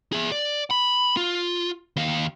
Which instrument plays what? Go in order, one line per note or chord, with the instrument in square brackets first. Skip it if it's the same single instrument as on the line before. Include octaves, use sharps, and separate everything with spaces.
[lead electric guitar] G#4 E5
D5
B5
F4
D#2 F5